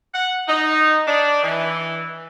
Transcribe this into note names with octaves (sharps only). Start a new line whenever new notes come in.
F#5
D#4
D4
E3